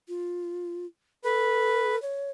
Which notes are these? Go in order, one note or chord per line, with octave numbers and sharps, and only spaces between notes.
F4
A4 B4
C#5